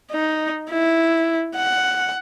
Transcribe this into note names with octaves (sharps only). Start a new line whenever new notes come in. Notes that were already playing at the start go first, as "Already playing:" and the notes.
D#4
E4
F#5